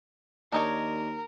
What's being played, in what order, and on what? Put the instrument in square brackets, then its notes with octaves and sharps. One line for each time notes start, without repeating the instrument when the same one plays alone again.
[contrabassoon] D#2 [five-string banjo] D4 D#4 C#5 [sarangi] A#4